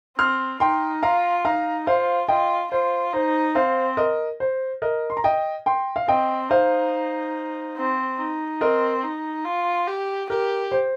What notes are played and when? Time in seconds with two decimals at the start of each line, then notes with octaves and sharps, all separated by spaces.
0.18 C4 C6 F6
0.60 D#4 G5 C6
1.03 F4 F5 A#5
1.45 D#4 F5 A#5
1.87 F4 C5 F5
2.28 F4 D#5 G5
2.71 F4 C5
3.13 D#4 C5
3.55 C4 C5 F5
3.97 A#4 D#5
4.40 C5
4.82 A#4 D#5
5.10 C6
5.17 A#5
5.24 D#5 G5
5.66 G5 C6
5.96 F5
6.08 C4 D#5 G5
6.50 D#4 C5 F5
7.76 C4
8.18 D#4
8.61 C4 A#4 D#5
9.04 D#4
9.45 F4
9.88 G4
10.29 G4 A#4
10.72 C5